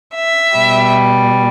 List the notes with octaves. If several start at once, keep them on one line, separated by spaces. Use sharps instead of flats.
E5
B2 G3